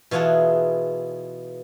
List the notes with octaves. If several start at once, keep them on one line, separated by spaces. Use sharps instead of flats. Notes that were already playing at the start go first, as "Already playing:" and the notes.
B2 E3 F4 G#4 F#5 A5